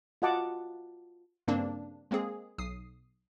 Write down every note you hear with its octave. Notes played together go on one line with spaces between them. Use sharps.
F4 F#4 D#5 F#5 A5 D6
G2 C#3 A#3 C4 D4
G#3 A#3 C4 G#4
B1 D#6 C7